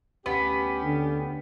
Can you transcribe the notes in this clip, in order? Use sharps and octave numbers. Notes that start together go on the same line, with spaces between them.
D2 B3 C#4 G4
D3